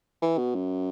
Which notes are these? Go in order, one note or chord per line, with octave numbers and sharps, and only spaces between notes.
E3
B2
F#2